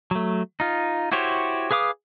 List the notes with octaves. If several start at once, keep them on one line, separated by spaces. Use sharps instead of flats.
F#3 A3
D#4 F4
E4 F#4 G4 C5 C#5
G#4 B4 F5 D6 D#6